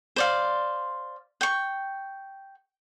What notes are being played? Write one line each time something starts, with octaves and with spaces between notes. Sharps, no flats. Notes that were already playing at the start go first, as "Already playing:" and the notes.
C5 D5 F5
G5 C#6